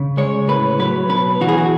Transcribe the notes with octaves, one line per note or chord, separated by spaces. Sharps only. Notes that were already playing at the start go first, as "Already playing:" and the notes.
Already playing: C#3
G#3 C#5
A2 B4
F#3 B4
B2 B4
E3 F#4
G#4
F#4